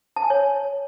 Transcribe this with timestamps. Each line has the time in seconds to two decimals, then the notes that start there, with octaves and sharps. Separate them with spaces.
0.16 A5
0.23 G#5
0.30 C#5